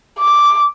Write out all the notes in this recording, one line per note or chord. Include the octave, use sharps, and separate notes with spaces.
D6